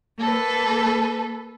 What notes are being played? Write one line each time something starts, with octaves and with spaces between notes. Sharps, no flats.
A#3 A4 B4